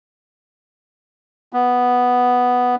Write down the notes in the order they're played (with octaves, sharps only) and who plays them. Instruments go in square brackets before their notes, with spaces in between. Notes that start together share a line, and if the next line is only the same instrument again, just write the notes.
[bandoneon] B3